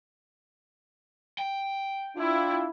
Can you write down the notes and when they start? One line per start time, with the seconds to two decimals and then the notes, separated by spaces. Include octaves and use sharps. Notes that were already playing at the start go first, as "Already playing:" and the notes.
1.38 G5
2.17 D4 E4 F4